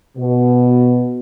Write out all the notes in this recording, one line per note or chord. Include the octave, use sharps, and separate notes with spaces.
B2